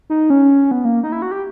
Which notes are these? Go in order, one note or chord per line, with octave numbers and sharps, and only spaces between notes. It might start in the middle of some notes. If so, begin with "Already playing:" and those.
D#4
C#4
B3
A#3
D#4
E4
F#4
G4